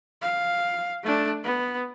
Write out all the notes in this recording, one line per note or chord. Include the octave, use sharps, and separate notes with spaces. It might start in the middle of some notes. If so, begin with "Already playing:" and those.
F5
A3 D4
B3